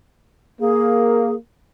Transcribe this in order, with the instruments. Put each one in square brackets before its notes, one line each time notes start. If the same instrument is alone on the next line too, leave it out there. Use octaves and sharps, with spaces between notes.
[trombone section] A#3 [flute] G#4